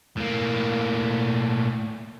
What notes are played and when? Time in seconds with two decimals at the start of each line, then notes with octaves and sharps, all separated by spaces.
0.17 A2 A#3